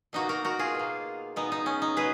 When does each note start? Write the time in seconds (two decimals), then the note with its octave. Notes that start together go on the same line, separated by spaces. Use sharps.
0.13 B2 A#3 D#4 F#4
0.29 F#4 A#4
0.45 F#4 A#4
0.59 F4 G#4
0.75 B2 A#3
1.36 B2 G#3 B3 D#4
1.52 D#4
1.66 C#4
1.82 D#4
1.97 B2 G#3 G#4 B4